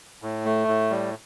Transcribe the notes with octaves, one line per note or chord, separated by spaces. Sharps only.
A2
A3
A2
G3